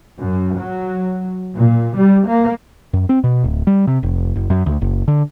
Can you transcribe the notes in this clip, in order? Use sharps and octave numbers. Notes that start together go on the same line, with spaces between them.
F#2
F#3
A#2
G3
A#3
F#2
C4
B2
D1
G3
C3
F1
F#1
F#2
D2
F#1
D3